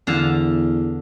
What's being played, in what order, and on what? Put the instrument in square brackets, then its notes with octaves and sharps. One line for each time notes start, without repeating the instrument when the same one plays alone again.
[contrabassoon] E2 [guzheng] D3 F5 A5